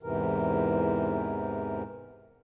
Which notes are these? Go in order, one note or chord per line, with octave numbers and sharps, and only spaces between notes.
E2 G#2 C3 E3 A#4